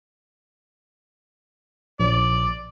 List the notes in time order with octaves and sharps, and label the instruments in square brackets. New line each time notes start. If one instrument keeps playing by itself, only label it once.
[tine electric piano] A#1 [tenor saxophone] D5